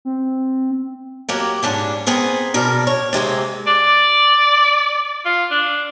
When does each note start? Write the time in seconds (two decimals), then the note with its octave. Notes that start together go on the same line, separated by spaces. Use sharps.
0.05 C4
1.29 F#3 A#3 G4
1.63 G#2 C#4 D4
2.06 B3 C4 G#4 A#4
2.54 B2 D4 A#4
2.87 C#5
3.13 C3 G#3 A#3 C4
3.67 D5
5.25 F4
5.51 D4